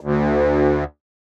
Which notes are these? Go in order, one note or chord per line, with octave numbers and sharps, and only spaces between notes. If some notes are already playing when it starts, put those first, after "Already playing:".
D2